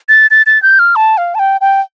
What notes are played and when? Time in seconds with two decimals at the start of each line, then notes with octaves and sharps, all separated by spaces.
0.09 A6
0.31 A6
0.46 A6
0.63 G6
0.79 F6
0.96 A5
1.18 F5
1.35 A5
1.39 G5
1.61 G5